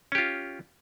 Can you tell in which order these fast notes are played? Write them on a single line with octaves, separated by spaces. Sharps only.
C#4 G4 F4